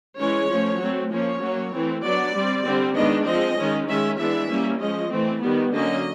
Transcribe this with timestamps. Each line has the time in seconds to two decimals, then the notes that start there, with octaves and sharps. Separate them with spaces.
0.19 E3 G#3 C#4 C#5
0.50 F3 A3 C#4
0.80 F#3 A3 C4
1.11 F3 A#3 C#4 C#5
1.42 F#3 A#3 C#4
1.73 E3 A3 C4
2.03 F#3 B3 D4 D5
2.34 G3 C4
2.65 D3 G3 C4
2.96 D#3 G#3 B3 D4 D#5
3.26 F3 G#3 C4 D#5
3.57 D#3 G#3 C#4
3.88 D#3 G#3 C#4 E5
4.19 E3 G#3 B3 D4 E5
4.50 G3 A#3 C#4
4.80 F3 G#3 C#4 D#5
5.11 E3 A3 C4
5.42 D#3 G3 B3
5.73 D3 F#3 A#3 C#4 D#5